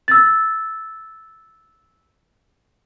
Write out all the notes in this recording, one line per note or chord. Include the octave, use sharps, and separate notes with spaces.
E6 A6